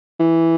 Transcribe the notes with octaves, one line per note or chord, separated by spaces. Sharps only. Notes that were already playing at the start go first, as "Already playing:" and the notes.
E3